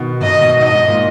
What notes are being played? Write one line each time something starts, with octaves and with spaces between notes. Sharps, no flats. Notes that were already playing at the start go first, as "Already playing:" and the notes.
Already playing: B2 D#3
B2 D#3 D#5
G#2 B2
G#2 D#5
G#2
A#2